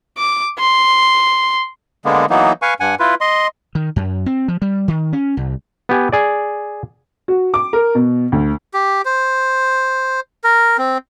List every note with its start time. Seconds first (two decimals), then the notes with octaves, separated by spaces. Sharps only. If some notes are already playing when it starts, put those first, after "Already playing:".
0.18 D6
0.59 C6
2.05 D3 G#3 A#3 B3
2.30 E3 F#3 A#3 B3 D#4
2.62 B4 F5 G#5 C#6
2.80 G2 F#5 G#5
2.99 E4 F4 B4
3.21 D#5 C6
3.75 D#3
3.96 F#2
4.26 C4
4.48 F3
4.62 G3
4.88 D#3
5.13 C#4
5.37 C2
5.89 B3 G4 G#5
6.12 G#4 D5
7.28 F#4
7.54 D6
7.73 A#4
7.95 B2
8.32 D2
8.74 G4
9.05 C5
10.44 A#4
10.78 C4